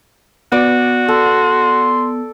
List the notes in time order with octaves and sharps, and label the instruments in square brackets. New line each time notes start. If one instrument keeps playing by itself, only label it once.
[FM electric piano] B3 [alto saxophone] F#4 [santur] D5
[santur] A4 [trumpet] C6